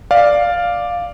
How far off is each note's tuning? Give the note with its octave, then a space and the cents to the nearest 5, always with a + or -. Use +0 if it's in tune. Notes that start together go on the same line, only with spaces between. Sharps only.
D5 +0 F5 +0